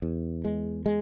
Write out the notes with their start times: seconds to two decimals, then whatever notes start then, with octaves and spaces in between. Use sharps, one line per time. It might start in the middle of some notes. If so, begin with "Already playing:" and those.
0.02 E2
0.45 G#3
0.86 G#3